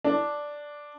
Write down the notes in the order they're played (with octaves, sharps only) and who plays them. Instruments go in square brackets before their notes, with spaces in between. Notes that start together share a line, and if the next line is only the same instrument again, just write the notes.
[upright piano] D4